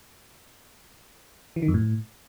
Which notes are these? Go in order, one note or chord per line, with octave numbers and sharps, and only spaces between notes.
E3
D#3
F2
A2